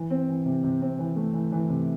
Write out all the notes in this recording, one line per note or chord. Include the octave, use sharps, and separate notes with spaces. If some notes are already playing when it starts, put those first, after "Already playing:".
Already playing: E3
C4
E3
C3
C3
C4
E3
A3
E3
E3
C3